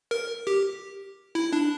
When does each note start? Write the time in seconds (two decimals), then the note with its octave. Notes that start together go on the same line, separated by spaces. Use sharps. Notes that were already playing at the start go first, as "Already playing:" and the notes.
0.11 A#4
0.47 G4
1.35 E4
1.53 D4